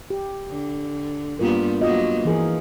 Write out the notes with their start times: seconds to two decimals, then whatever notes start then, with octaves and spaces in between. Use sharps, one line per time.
0.10 G4
0.48 D3
1.39 G2 G3 A#3 B3 F4 A#4
1.81 F#3 A#3 B3 F4 F#4 D#5
2.25 E3 F3 G#4 A#4